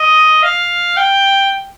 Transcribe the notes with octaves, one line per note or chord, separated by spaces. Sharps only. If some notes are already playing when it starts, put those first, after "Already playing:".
Already playing: D#5
F5
G5